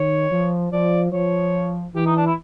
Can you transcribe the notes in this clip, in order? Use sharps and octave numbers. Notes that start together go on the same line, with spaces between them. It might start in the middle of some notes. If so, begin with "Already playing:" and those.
Already playing: D#3 C#5
F3
F3 D5
F3 C#5
E3 G4
D#4
D4
E4